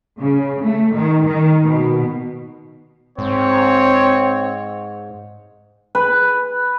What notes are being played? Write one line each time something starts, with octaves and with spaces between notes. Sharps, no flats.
C#3
A3
D#3
D#3
B2
G#2 C4 C#5
B4